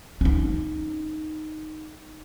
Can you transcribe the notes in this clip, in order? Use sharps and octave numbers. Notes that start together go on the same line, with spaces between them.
C#4 D#4